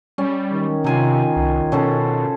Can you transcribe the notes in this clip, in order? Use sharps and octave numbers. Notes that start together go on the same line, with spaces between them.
G3 C#4
D#3
C3 F4 G#5 A#5
C2
B2 C#4 A4 C5